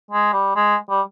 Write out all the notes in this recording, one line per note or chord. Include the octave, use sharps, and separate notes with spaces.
G#3
G3
G#3
G3